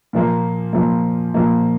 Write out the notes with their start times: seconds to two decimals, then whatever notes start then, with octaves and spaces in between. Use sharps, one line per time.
0.13 A#2 F3 A#3
0.73 A#2 F3 A#3
1.34 A#2 F3 A#3